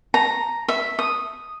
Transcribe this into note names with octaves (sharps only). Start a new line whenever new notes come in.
A#5
E5
D#6